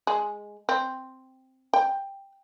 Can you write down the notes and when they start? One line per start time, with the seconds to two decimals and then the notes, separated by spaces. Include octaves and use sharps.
0.07 G#3
0.69 C4
1.74 G5